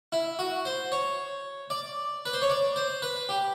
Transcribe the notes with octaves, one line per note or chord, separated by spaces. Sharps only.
E4
F#4
C5
C#5
D5
B4
C5
C#5
D5
C5
B4
G4